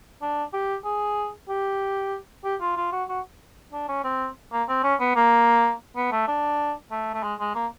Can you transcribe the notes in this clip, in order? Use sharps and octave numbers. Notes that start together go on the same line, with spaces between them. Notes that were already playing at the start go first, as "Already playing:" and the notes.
D4
G4
G#4
G4
G4
F4
F4
F#4
F#4
D4
C#4
C4
A#3
C4
C#4
B3
A#3
B3
A3
D4
A3
A3
G#3
G#3
A#3